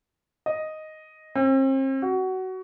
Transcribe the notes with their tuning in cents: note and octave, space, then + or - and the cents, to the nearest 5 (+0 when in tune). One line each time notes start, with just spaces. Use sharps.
D#5 +0
C4 +40
F#4 +20